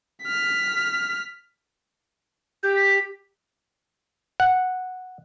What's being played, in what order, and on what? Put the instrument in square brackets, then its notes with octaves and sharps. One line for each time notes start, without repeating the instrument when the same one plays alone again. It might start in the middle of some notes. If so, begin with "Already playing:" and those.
[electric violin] F6 B6
[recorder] G4 [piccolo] G6
[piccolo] B6
[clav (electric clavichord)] F#5